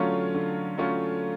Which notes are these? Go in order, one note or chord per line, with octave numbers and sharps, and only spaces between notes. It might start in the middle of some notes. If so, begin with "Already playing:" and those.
Already playing: D3 F#3 A3 C#4 F4
D3
F#3 A3 C#4 F4